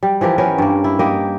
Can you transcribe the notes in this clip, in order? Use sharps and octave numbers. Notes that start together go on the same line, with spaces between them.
G3
E3 F3 G4 A#4
B3 C#4 A#4 C#5
G2 A#3
E4
A#3 G4 D#5